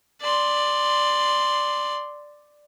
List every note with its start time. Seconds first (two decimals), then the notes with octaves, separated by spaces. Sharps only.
0.21 D5 C6